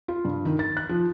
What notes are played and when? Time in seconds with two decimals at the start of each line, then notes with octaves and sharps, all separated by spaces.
0.08 F4
0.25 G2
0.45 D#3
0.59 A6
0.77 F#6
0.89 F3